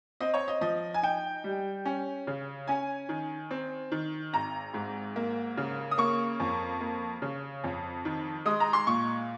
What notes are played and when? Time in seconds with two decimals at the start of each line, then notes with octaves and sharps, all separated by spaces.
0.20 C4 D#5
0.34 C#5
0.48 D#5
0.61 F3 D#5
0.94 G#5
1.03 D#4 G5
1.44 G3
1.85 C#4
2.27 C#3
2.68 C#4 G#5
3.09 D#3
3.51 C4
3.92 D#3
4.33 G#1 A#5
4.74 G#2
5.16 A#3
5.57 C#3
5.91 D#6
5.98 A#3 C#6
6.40 F2
6.80 A#3
7.22 C#3
7.64 F2
8.05 D#3
8.45 G#3 D#6
8.60 A#5
8.73 C6
8.87 A#2 C#6